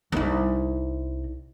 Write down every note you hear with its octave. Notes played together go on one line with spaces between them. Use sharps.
C2 D#4